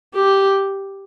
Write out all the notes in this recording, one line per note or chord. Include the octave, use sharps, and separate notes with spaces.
G4